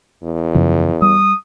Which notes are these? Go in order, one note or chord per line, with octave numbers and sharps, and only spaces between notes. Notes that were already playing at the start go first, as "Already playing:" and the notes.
E2
F#2 C#3 F3
G3 D#6